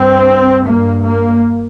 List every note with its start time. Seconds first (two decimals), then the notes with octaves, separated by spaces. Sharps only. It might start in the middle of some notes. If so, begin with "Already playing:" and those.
Already playing: G2 C4
0.67 G2 A#3
1.05 A#3